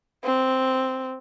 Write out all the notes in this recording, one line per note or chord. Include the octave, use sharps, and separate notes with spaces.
C4